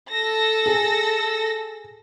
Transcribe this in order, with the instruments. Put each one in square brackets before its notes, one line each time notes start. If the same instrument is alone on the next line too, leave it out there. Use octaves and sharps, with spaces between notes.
[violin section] A4 E6 A#6
[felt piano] G#4